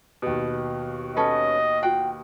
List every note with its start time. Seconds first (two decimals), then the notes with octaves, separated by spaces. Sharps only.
0.22 D#2 B2
1.16 C#4 A4 B4 D#5
1.82 F4 F#4 G5